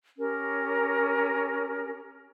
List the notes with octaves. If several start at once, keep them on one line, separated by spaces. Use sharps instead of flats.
C#4 G4 A#4